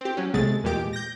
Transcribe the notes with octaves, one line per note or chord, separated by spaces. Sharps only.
C4 G4
F#3 C#4
B1 C3 G#3 A3 A6
E2 A#2 G#3 G4 D6
G6 A#6